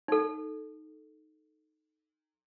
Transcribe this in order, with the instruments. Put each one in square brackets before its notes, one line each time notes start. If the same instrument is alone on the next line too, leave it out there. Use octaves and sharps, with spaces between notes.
[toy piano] D#4 A4